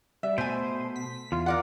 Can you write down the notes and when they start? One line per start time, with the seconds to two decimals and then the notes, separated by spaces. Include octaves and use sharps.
0.23 G3 E5
0.38 B2 A3 C5 G#5
0.96 B6
1.32 E2 F4
1.46 A#4 D5 F#5